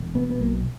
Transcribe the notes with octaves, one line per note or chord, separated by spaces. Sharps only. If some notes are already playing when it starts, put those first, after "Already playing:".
Already playing: E1
B2 B3
B3
B1 A#3